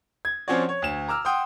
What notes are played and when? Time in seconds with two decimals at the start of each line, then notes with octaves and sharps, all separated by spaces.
0.25 G#6
0.48 F3 C4 C#4 F#4 C#5 D5
0.69 C#5
0.82 D2 E7
1.08 A#5 D6 E6 F6
1.25 F#5 G5 C6 D#6